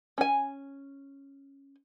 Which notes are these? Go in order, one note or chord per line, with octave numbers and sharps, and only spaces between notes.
C#4 G#5